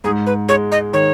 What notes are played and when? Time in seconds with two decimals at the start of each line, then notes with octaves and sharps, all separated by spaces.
0.04 G#2 G#4
0.26 B4
0.49 G#3 C#5
0.72 D#5
0.93 D#3 C#5